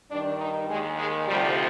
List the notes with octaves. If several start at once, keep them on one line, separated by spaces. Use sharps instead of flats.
G2 D#3 D4
D#4
D#2 D#3 G#3
G#3
D2 C3 F3 G3